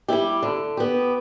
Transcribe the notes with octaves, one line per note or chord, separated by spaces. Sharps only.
G3 E4 G4
D3
B3 G4